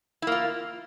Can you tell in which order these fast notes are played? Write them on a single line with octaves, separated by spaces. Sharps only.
E4 A#3 F4